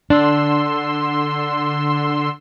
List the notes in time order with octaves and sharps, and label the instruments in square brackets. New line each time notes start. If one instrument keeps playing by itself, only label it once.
[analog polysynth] D3 C6 E6 [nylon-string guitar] D4